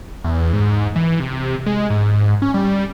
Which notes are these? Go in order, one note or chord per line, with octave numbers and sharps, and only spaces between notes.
E2
G#2
E3
C3
G#3
G#2
G#2
C#4
G3